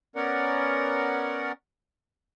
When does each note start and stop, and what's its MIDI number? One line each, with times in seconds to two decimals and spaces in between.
0.16 1.52 59
0.16 1.52 61
0.16 1.52 70
0.16 1.52 74
0.16 1.52 78